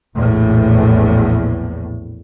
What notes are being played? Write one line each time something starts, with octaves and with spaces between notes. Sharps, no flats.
A#1 E2 A2